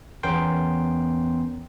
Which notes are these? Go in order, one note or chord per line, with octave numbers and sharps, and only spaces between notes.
E2 B3 C#4 A#4 G5 C6